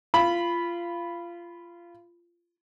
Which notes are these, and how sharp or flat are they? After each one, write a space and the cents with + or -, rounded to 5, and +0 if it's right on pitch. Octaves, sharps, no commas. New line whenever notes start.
F4 -20 B5 +0